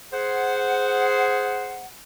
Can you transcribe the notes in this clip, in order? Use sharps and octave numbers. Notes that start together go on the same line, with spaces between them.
G#4 C5 F#5